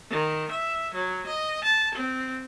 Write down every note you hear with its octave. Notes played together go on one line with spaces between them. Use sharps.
D#3
E5
F#3
D#5
A5
C4